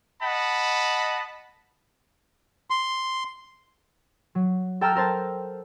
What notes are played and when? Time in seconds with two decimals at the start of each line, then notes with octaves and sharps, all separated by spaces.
0.23 D#5 F#5 A5 B5
2.70 C6
4.35 F#3
4.81 A4 G5 A5 A#5 E6 F6
4.95 A4 A#4 C5 A5